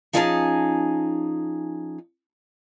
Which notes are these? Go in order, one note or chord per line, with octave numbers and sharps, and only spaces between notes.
F3 C#4 D#4 E4 G#4 A5